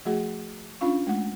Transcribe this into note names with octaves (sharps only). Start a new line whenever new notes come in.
F3 A3 F#4 G#4 F#5
C#4 D4 F4 F5 C#6
G#3 A3 F#5